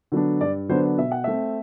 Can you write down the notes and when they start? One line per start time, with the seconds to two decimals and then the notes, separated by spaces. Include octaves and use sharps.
0.12 D3 F#3 B3 D4
0.41 G2 D5
0.69 D3 F#3 B3 D4 C5
0.98 B2 E5
1.12 F#5
1.24 A3 C4 E5